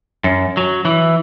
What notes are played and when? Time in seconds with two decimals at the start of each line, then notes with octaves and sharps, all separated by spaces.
0.24 F#2
0.57 F#3
0.85 E3